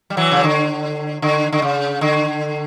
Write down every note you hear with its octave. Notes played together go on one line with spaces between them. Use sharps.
G3
E3 F#3
C#3
D3
D3
D3
C#3
D3